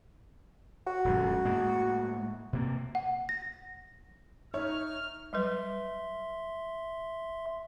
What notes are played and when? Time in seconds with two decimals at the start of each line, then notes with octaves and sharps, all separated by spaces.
0.87 F#4
1.05 D#1 F#2 G#3
1.45 A2 G#3 A#3
2.53 C3 A#3
2.95 F#5
3.29 A#6
4.54 D#4 C#5 E5 F6
5.33 F#3 G3 B4 E5 C6